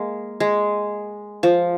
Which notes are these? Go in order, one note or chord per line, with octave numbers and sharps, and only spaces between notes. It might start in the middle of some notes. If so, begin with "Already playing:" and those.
Already playing: G#3 A#3
G#3
F3